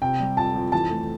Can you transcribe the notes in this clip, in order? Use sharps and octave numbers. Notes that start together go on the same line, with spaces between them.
C3 G5
G3
F2 A5
F2
E3 A5
A3